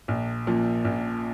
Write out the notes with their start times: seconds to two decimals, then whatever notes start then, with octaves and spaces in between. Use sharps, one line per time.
0.08 A#1
0.47 A#2 F3
0.85 A#1